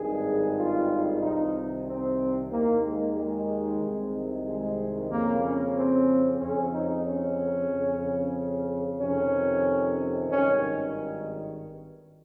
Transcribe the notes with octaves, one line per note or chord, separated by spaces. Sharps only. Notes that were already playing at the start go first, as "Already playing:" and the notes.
Already playing: G#1 G2 D#3 G#4
F4
C2 C3 D#3 D#4
C4
D#2 D#3 A#3
G#3
G#3
C2 C3 D#3
G#3
F2 C#3 A#3
C#4
C4
F2 C#3 C#4
D#4
C#4
F2 C#3
F2 C3 D#3 C#4
G#1 G2 D#3 C#4